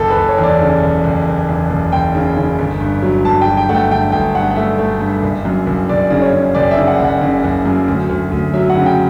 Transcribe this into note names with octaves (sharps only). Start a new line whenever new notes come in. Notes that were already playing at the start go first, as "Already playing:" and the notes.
Already playing: F#1 A4
B4
F#1
C#5
E2
D5
C#3
F#1
F#1
F#1
E2
F#1
F#1 G5
C#3
C#3
G1
G2
F#3
G2 A5
G5
F#3
G5
A3 F#5
G5
G1 G5
G1 G5
G2 F#5
F#5
A3 E5
A3
G2
F#1
F#2
F#1
F#1 D5
C#3
C#5
C#3
F#1 D5
E5
C#3
F#5
F#1 F#5
C#3
F#1
F#2
D2
D2
D2
F#3 E5
F#5
C#3
G5